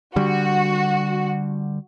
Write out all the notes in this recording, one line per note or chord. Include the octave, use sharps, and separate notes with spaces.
D3 G3 F#4